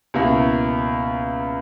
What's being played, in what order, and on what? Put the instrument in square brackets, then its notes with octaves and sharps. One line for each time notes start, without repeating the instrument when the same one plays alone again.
[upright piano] C#2 B2 A#3 E4